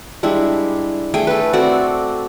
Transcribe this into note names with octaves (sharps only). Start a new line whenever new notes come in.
G3 G#3 D4 E4
A3 G#4 G5 G#5
A4 B4
C4 F#4 A4 D5